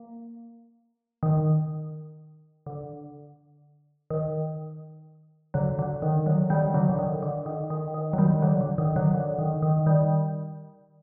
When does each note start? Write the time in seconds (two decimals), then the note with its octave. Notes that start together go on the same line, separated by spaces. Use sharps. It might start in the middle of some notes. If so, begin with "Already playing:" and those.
Already playing: A#3
1.23 D#3
2.66 D3
4.10 D#3
5.54 D3 F#3
5.79 D3 F#3
6.02 D#3
6.26 D3 F#3
6.50 D#3 G3
6.74 D3 F#3
6.89 D3
6.99 D#3
7.22 D3
7.46 D#3
7.70 D#3
7.94 D#3
8.13 F#3
8.18 D#3 G3
8.42 D3 F#3
8.61 D3
8.78 D#3
8.96 D3 F#3
9.14 D3
9.39 D#3
9.62 D#3
9.86 D#3 G3